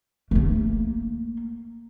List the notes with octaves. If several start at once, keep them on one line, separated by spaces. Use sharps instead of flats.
A3 A#3